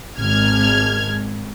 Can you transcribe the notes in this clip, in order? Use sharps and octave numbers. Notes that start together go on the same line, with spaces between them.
G#1 F6 G#6